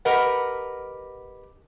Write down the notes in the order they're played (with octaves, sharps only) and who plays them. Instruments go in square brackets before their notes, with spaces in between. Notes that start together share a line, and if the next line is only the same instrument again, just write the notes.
[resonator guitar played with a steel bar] G4 A#4 B4 D#5 F#5